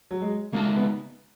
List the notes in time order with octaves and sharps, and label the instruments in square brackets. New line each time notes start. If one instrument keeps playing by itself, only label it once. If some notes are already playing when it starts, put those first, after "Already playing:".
[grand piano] F#3
G#3
[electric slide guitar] C#3 G#3 D#4 F#4 [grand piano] A#3
[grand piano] B3